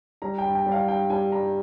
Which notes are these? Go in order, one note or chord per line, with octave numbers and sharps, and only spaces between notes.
G3 A#5
G5
G2
G5
G3
F5
G2 G5
G3 G#5
G2 A#5